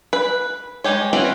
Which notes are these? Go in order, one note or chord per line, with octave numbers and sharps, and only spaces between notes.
B4
G#3 A3 D#4 G4 C#5
E3 C4 C#4 F#4